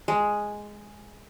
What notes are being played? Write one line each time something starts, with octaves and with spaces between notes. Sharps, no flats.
G#3